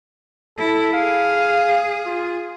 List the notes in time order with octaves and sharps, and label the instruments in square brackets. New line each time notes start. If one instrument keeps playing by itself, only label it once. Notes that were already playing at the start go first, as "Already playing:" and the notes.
[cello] E4 [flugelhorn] A4
[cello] G#4 [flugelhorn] F5
[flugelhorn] F4